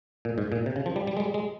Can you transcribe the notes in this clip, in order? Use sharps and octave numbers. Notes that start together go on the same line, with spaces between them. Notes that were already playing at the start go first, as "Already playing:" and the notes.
A#2
G#2
A#2
C3
C#3
F3
G3
G3
G#3
G3
G#3